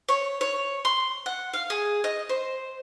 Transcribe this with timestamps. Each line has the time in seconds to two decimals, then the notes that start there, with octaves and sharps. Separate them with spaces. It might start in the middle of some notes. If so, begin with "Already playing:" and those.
0.09 C#5
0.41 C#5
0.85 C6
1.26 F#5
1.54 F5
1.70 G#4
2.04 D#5
2.30 C5